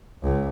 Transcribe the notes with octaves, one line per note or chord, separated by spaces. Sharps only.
C#2